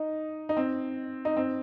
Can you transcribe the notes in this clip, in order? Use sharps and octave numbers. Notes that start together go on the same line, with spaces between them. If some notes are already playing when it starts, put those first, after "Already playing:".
Already playing: D#4
D#4
C4
D#4
C4